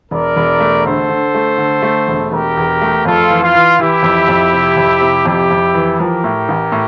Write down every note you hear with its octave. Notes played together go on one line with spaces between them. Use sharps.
E1 A#4 D5
E1
A3
D3 A4 C5
D3
A3
D3
A3
E1
E1 G4 A#4
E2
A3
F2 F4 A4
E3
F4
E3
E3 E4 G4
F2
F2
C3
F2
C3
F2 E4 G4
F2
E3
F3 G4 A#4
A2
A1
A2